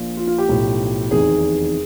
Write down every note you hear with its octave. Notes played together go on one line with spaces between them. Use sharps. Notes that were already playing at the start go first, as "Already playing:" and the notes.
Already playing: A#1 A#2 F3
F4
F4
G4
B1 A2 F3
F1 E2 C3 D#3 G#4